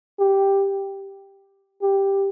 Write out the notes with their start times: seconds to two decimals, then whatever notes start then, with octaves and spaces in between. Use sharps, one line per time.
0.19 G4
1.82 G4